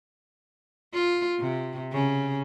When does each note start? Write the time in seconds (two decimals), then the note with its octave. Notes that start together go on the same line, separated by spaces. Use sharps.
0.94 F4
1.40 C3
1.93 C#3